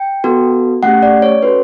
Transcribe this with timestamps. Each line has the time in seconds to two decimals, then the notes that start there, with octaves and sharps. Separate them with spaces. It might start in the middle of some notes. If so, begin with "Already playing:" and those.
Already playing: G5
0.24 B3 F#4 A4
0.83 A3 C#4 G4 F#5
1.03 D5
1.22 C#5
1.43 C#4 F#4 A4 B4